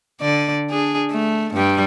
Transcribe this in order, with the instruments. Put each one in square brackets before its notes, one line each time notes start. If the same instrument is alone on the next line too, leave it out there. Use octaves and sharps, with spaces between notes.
[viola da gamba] D3 D5
D4 G#4
A3
G2 G3